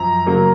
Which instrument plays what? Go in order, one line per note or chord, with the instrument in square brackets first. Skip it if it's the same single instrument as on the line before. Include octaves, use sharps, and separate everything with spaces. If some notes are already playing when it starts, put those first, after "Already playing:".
Already playing: [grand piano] F#2 F3 A#5
C#3 F#3 A#3